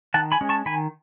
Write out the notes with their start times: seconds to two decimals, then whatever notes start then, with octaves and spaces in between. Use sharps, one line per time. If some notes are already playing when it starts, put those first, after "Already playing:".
0.14 D#3 F#5 A5
0.32 G#5 B5
0.41 G#3 C#4
0.49 A5 C#6
0.66 D#3 G#5 B5